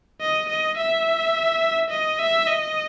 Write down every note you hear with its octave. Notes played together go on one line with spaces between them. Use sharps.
D#5
D#5
E5
D#5
E5
D#5